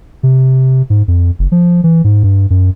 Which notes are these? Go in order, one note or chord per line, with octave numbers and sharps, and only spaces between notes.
C3
G#2
F2
F#1
F3
E3
G#2
G2
F#2